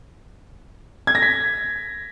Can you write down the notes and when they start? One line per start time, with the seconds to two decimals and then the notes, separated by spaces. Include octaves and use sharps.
1.07 G#6
1.15 A#6
1.22 B6